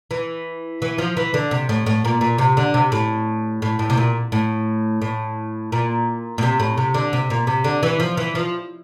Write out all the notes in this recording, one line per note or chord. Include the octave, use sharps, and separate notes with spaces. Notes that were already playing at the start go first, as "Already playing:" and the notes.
E3
E3
F3
E3
D3
C3
A2
A2
A#2
A#2
C3
D3
C3
A2
A2
A2
C3
A#2
A2
A2
A#2
A#2
C3
A2
C3
D3
C3
A#2
C3
D3
E3
F3
E3
F3